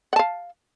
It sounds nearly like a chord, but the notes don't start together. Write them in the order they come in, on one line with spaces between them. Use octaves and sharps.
F#5 A5 F5